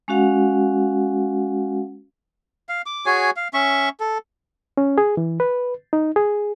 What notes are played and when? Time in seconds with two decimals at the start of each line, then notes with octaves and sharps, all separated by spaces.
0.08 G#3 C#4 F#4 F5 F#5
2.69 F5
2.86 D6
3.06 F#4 G#4 C#5 G#5
3.36 F5
3.54 C#4 E5 C#6
4.00 A4
4.77 C#4
4.98 G#4
5.17 E3
5.40 B4
5.93 D#4
6.16 G#4